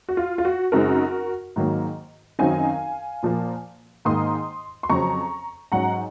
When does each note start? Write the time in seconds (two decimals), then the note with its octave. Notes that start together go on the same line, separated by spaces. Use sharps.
0.09 F#4
0.17 F4
0.38 F4
0.45 F#4
0.72 F#2 C#3 G#3 C4 D#4 F#4 A#4
1.56 G#2 D#3 F#3 A#3
2.39 F#2 D#3 F#3 C4 D#4 F5 G#5
3.23 A#2 F3 A#3
4.05 G#2 D#3 A#3 C6 D#6
4.83 C6
4.89 F2 C#3 F#3 C4 A#5 C#6
5.72 G#2 F#3 C#4 F#5 A#5